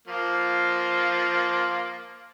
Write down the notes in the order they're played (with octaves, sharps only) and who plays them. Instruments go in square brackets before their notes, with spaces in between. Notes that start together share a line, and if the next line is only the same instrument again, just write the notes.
[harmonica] F3 A#3 F4